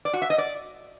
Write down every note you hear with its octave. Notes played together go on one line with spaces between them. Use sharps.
D5
F#4
E5
D#5
D5